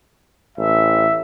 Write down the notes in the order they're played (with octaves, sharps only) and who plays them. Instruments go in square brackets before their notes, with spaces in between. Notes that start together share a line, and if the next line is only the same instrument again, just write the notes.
[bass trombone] A1 [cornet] E5